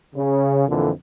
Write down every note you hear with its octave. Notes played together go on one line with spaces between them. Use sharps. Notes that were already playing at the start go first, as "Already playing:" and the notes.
C#3
F2 A#2 D3 E3